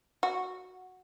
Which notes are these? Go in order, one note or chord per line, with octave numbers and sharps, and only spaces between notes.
F#4